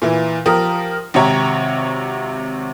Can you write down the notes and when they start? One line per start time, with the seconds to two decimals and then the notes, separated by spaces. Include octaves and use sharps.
0.02 A#2 E3
0.46 F3 G4 A#4 D#6
1.14 G#1 C3 G4 C#5 A#5